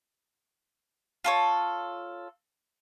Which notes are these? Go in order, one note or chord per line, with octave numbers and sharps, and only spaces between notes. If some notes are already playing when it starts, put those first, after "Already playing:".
F4 A4 C#5